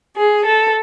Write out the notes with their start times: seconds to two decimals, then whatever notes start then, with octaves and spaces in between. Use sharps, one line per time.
0.16 G#4
0.44 A4